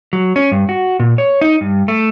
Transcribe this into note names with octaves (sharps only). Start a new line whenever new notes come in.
F#3
C#4
G2
F#4
A#2
C#5
D#4
G2
A3